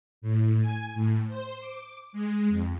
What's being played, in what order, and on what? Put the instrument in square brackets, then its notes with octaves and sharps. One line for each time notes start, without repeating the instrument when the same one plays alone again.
[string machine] A2
G#5
A2
C5
D6
G#3
F2